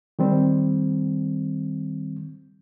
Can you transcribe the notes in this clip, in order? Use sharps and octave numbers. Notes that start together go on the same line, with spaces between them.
D#3 G3 C4